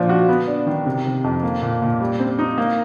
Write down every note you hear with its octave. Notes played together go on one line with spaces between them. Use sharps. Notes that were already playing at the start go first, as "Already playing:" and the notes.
Already playing: A#2 F3 D4
F#4
B3
D4
D#3
C3
C3
F2
A#3
A#2
A#2
G3
C4
D#4
A#3